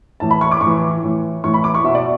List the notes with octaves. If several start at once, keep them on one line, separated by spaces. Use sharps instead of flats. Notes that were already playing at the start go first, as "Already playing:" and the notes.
A2 E3 A5
B5
C#6
D6
A2 C#6
E3
A2 E3
A2 E3 C#6
B5
D6
C#6
B2 E5
D5